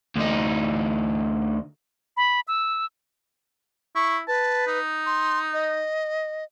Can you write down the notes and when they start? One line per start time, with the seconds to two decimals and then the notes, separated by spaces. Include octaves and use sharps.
0.16 D2 D#4
2.17 B5
2.48 E6
3.95 E4 C#6
4.28 B4 A5
4.67 D#4
5.06 C6
5.53 D#5